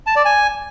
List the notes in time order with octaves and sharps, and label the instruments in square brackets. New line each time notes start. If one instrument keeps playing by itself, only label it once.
[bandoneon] A5
D5
G#5